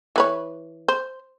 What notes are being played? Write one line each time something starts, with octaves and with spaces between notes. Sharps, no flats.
E3 B4 C#5
C5